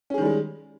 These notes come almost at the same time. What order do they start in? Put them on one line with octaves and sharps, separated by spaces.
C#4 G#4 D#3 G3 G#3